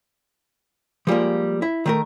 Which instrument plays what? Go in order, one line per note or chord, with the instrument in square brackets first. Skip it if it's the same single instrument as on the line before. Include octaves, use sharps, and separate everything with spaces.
[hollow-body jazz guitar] F3 G3 G#3 A#3
E4
D#3 A3 A#4